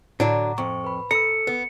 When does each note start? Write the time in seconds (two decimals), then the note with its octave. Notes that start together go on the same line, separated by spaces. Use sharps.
0.20 A2 D3 F#3 D4 F#5 A#5 D6
0.58 F2 C5 C#6
0.84 B4 B5
1.11 A4 A#5 E6 C#7
1.47 B3